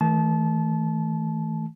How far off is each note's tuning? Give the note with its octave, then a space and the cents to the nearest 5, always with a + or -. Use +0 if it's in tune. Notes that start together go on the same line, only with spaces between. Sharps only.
E3 -45 A3 +0 A5 -25